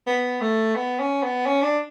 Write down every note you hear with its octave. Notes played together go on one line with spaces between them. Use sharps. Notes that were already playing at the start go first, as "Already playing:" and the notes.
B3
A3
B3
C#4
B3
C#4
D4